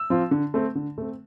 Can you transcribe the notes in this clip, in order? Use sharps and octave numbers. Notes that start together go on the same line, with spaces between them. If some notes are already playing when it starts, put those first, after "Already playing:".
Already playing: E6
F3 C4 F4
D3
A3 C4
D3
A3 C4